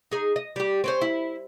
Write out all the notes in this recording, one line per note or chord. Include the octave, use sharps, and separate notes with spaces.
D#4 G#4
D#5
G3 G4
C4 C#4 C5
E4